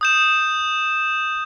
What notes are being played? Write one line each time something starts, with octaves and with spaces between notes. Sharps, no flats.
D#6 G6 E7